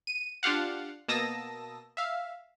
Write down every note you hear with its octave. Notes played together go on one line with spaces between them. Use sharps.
D#7
D4 F4 G4 F5 F#5
B2 A#3 A5 D#6 E6 A#6
E5 F5